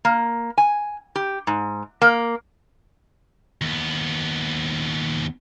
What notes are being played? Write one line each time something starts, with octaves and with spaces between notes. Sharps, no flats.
A#3
G#5
G4
G#2
A#3
D#2 B3